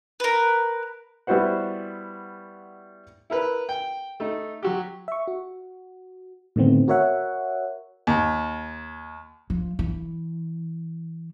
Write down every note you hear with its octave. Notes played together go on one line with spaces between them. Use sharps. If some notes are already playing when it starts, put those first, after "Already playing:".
A#4 B4
G3 B3 E4 F#4 C5 F#5
E4 A#4 B4
G5
A3 D#4
F#3 F#4 G4
E5 C#6
F#4
A2 D3 D#3 A3 B3 C4
F#4 A#4 C#5 E5 F#5
D#2
F3
E3